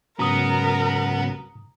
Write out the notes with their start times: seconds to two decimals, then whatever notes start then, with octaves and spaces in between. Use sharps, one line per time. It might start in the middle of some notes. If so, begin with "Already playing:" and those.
0.19 G#2 C#3 F#3 B3 A#4 A#5 D#6